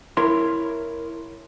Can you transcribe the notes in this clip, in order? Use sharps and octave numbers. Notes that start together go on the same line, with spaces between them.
E4 A#4 C#5 C6